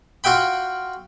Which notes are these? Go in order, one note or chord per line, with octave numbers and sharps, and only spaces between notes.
F4 F#4 E5 G5 B5